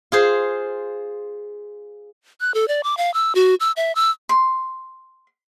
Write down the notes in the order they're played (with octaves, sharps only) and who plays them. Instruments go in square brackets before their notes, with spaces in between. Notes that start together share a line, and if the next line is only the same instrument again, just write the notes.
[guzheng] F4 G#4 C5
[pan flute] F#6
A4
D5
D6
F5
E6
F#4
E6
E5
E6
[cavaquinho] C6